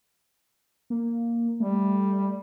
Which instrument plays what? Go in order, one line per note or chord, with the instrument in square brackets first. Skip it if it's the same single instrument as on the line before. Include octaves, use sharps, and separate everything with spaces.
[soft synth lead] A#3
[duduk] G3 [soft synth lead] A3